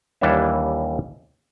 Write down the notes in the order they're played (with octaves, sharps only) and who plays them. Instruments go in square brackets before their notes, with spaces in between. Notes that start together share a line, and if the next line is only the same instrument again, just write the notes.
[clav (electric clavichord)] D#2 E3 G3 D4 C#5 E5